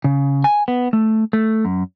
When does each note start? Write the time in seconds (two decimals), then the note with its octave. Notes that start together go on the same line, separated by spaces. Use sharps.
0.04 C#3
0.44 G#5
0.68 B3
0.93 A3
1.33 A3
1.65 F#2